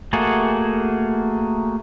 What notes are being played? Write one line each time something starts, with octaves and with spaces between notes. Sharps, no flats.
A3 A#3 F#4 G#4